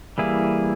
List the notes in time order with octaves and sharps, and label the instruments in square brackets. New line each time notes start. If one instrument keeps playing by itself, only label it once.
[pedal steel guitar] E3 G3 A#3 E4 G#4